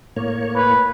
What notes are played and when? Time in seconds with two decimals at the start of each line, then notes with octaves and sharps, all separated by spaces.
0.16 A2 A#3 C#5
0.55 B4